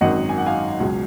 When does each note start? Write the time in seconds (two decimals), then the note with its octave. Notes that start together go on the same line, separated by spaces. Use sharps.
0.01 G#1 F#2 D#3 F#3 D#5 F#5
0.29 G#5
0.38 F#5
0.46 F5 G#5
0.80 C#2 B2 F#3